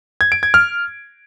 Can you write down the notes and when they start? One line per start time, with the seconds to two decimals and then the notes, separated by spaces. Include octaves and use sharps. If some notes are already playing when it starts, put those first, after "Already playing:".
0.21 G#6
0.32 D7
0.43 G#6
0.54 F6